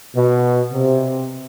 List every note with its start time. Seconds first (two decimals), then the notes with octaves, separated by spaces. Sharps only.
0.16 B2
0.72 C3